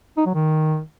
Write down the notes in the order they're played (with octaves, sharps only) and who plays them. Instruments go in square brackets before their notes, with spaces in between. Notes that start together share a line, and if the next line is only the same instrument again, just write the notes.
[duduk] D#4
F#3
D#3